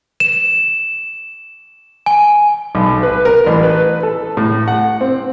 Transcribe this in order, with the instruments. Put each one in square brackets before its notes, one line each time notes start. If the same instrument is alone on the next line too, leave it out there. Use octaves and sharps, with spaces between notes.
[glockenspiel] E7
G#5
[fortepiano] B1
B4
A#4
A1
B4
A4
A2
F#5
C4